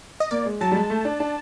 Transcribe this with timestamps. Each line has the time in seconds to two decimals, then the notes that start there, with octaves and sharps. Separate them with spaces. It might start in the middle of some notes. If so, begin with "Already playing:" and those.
0.20 D#5
0.31 A#3 D5
0.46 G#3
0.61 F#3 A5
0.72 G3
0.75 G#3
0.90 A3
1.05 D4
1.20 D4